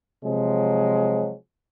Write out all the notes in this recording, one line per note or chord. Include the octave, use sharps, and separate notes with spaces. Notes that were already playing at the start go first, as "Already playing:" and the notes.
C3 F3 F#3 G#3